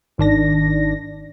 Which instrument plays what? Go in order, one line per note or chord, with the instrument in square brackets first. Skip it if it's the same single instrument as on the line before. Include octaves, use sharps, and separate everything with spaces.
[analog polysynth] G#1 D#3 D4 A#6